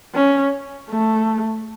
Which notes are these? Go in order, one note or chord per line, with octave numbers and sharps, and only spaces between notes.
C#4
A3